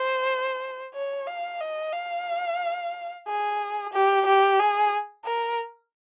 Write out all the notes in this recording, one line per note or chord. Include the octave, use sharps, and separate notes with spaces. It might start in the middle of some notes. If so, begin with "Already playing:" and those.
Already playing: C5
C#5
F5
D#5
F5
G#4
G4
G4
G#4
A#4